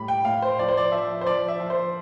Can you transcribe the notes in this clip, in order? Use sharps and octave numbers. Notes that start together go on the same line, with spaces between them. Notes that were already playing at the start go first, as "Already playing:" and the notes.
Already playing: A2 G3 B5
G5
A2 F5
C5
F3 D5
C5
D5
F3 E5
C5
F3 D5
E5
F3
C5